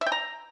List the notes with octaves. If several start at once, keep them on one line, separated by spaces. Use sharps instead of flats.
E5
G5
A#5